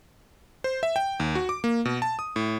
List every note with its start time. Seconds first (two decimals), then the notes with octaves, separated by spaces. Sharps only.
0.64 C5
0.83 E5
0.96 G5
1.20 D#2
1.35 F#4
1.49 D6
1.64 A#3
1.85 B2
2.02 A5
2.19 D#6
2.36 A2